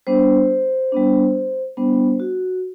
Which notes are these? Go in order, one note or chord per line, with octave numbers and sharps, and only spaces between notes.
G3 B3 D4 C5
G3 B3 D4
G3 B3 D4 C5
F#4